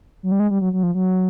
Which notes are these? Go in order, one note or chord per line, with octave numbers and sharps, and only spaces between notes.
F#3
G3
G#3
G3
F#3
F#3
F3
F#3